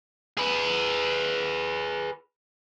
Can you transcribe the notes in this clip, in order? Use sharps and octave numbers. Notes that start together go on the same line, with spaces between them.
G#4 B4